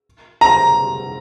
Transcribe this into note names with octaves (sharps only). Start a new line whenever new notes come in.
A#5